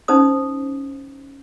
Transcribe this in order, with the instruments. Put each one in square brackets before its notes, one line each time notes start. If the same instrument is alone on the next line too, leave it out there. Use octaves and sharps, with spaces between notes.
[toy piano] C#4 D#4 C5 D#6